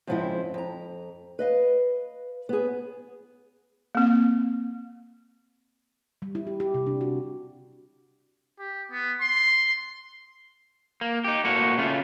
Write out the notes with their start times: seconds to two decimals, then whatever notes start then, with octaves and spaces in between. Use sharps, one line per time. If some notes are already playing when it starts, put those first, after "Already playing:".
0.07 F2 G#2 C#3 F3 C4 E4
0.54 F2 A#5
1.39 B4 D#5 F5
2.49 B3 G#4
3.95 A#3 C4
6.22 G3
6.35 E4
6.47 G4
6.60 G4
6.74 C3
6.87 D4
7.01 F#4
8.59 G4
8.91 B3
9.21 C6
11.01 A#3
11.24 D#4 G4
11.44 A2 A#3 F#4
11.78 C#3 A3 F4